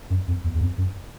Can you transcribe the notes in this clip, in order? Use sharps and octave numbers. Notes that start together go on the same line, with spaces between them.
F#2
F2
E2
E2
F2
F#2